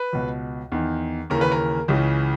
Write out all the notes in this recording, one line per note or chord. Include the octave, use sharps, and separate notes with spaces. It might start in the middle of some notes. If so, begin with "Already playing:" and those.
Already playing: B4
C#2 B2
E2 D#3
D#2 C#3 E3 A#4
B4
A#4
C#2 C#3 E3